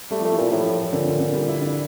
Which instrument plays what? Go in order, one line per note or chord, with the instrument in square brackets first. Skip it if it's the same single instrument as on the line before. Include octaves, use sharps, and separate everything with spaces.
[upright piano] G3 [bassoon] A3
[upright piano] F3 [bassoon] A3
[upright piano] E3
[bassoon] A#2 [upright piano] F3
[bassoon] A2 [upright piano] E3
[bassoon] A#2 [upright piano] D3
[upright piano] D3
D3
G3
E4
D4